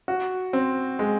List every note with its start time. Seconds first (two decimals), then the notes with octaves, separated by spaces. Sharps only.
0.08 F#4
0.53 C4
0.99 G#3